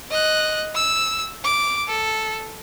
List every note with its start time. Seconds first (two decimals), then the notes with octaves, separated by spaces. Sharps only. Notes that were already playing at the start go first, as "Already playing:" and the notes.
0.10 D#5 F#6
0.75 E6
1.43 D6
1.88 A4